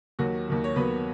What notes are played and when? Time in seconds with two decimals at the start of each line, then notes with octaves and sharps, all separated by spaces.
0.19 D#2 D#3 F#3 F#4
0.47 D#2 D#3 F#3
0.64 C#5
0.76 D#2 D#3 F#3 B3 B4